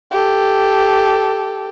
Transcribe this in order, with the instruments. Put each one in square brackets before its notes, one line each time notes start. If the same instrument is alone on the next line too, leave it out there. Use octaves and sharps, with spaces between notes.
[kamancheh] G4 A4